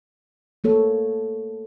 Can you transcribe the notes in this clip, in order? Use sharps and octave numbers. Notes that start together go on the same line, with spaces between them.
A3 A#3 A4 C#5